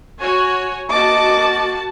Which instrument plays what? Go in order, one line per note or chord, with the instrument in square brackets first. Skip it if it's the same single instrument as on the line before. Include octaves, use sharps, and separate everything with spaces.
[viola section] F#4 C#5 G#5
[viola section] A#3 F#4 A5 [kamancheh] D#5 D6